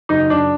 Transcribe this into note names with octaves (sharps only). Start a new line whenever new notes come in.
F#1 D#4
F#1 D4